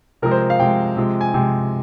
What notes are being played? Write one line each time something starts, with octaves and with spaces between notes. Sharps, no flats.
C3 F3 G#3 A#4
C5
F5
C3 F3 G#3 G5
C3 F3 G#3
G#5
C3 F3 G#3 G5